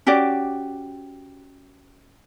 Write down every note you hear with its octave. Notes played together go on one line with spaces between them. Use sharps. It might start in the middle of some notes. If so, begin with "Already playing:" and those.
C#4 F#4 G4 D5